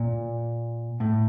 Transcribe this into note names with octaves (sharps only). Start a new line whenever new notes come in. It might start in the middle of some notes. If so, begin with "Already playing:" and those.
Already playing: A#2
A2